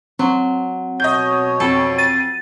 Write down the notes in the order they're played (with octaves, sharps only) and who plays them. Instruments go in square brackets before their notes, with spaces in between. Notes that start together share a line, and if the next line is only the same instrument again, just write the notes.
[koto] F#3 [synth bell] C4
[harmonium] B2 C#5 [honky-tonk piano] D#5 G6
[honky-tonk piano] F2 [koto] A4
[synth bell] A6 D#7